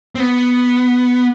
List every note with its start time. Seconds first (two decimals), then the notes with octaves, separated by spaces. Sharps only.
0.15 C4
0.20 B3